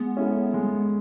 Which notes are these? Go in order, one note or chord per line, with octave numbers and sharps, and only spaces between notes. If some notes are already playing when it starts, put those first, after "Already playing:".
Already playing: G#3 B3
C#4 E4 A4
G#3